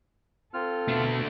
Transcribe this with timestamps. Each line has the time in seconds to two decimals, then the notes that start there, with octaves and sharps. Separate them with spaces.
0.54 C4 F4 A4 F6
0.88 B2 A3 D4